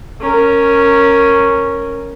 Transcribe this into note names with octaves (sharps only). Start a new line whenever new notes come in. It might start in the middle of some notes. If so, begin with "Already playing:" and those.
C#4 A#4